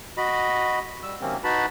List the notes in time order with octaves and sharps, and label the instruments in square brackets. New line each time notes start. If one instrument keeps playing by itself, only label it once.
[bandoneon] F#4 D#5 B5
G3 E6
C3 D#3 F#3 A#3 C4 C#4
D#4 F#4 B4 A5 B5